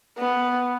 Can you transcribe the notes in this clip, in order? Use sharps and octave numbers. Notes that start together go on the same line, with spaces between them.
B3